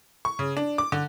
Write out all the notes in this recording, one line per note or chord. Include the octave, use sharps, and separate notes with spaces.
C#6
C#3
D4
D6
D3